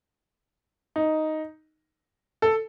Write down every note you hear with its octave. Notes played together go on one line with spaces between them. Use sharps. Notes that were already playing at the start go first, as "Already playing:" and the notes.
D#4
A4